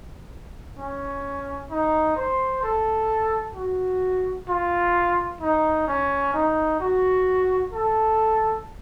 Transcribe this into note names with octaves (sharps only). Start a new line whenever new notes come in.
C#4
D#4
C5
A4
F#4
F4
D#4
C#4
D#4
F#4
A4